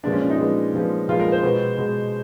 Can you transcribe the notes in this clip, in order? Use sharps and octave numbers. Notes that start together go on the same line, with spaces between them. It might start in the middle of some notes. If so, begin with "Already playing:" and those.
A#2 F3 G#3 B3 D4
C#4
D4
D#4
A#2 F3 G#3 B3
A#2 F3 G#3 B3
A#2 F3 G#3 B3 F4
A#4
C5
B2 G#3 B3
B2 G#3 B3